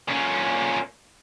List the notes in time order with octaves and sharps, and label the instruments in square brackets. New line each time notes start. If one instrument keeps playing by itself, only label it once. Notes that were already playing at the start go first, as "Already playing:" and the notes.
[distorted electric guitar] A#2 C#4